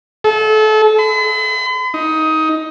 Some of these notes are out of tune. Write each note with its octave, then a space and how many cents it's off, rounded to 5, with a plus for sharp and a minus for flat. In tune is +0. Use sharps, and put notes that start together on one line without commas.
A4 -30
B5 +45
D#4 +15